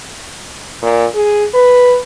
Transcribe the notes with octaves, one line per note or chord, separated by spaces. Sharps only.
A#2
G#4
B4